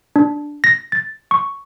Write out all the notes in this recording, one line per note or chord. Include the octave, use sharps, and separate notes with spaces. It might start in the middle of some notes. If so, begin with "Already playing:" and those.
D4
A#6
A6
C#6